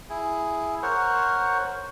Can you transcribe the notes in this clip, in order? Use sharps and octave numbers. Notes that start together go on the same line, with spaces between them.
E4 G#4
A#4 C5 C#5 F#5